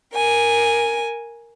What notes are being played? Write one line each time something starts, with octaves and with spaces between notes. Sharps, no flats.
A#4 G#5